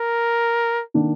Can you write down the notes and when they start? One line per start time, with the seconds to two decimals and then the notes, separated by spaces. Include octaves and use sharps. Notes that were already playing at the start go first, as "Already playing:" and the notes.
Already playing: A#4
0.94 D#3 A#3 D4